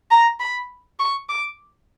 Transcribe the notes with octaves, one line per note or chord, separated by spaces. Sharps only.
A#5
B5
C#6
D6